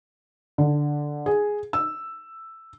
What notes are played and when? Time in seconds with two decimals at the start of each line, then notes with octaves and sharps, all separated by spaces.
0.58 D3
1.26 G#4
1.73 E6